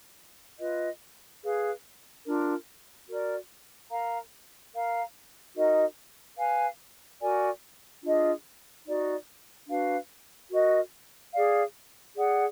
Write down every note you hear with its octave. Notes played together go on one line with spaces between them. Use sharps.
F4 B4 D#5
G#4 B4 F5
D4 F4 A#4
F#4 A#4 D5
A#4 F5 A#5
A#4 F5 A#5
D#4 F#4 A#4 D#5
B4 F5 G#5
F#4 A#4 D5 G#5
D4 F4 G#4 D#5
D#4 F#4 D5
D4 F#4 B4 F5
F#4 A#4 D#5
G#4 D5 F5
G#4 D5 F#5